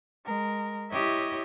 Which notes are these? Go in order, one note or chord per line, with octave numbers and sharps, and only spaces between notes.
G#3 A#4
E4 G4 C#5 D#5 E5